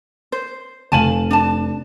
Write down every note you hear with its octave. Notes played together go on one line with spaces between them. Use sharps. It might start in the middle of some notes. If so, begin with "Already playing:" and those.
C5
F1 F5 G#5 A5 D#7 F#7
D4 A5